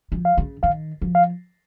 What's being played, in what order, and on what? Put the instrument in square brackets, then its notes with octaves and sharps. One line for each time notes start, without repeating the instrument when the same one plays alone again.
[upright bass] F3
[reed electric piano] F5
[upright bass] C#3
[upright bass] D#3 [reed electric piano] F5
[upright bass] F3
[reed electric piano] F5